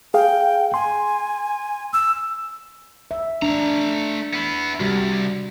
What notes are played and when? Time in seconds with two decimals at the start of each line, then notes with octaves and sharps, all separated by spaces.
0.14 G#4 F5 G5
0.74 G#5 C6
1.93 E6
3.11 E5
3.42 A3 D4 A#5
4.33 B3 E4
4.80 C2 G3 F#4